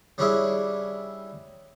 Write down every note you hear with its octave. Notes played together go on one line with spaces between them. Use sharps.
G3 C#4 D4 E4 G#4 E5